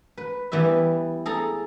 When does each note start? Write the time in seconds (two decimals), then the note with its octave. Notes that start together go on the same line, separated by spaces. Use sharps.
0.17 B4
0.52 E3 G3 B3 E5
1.26 G#4 A4 A#5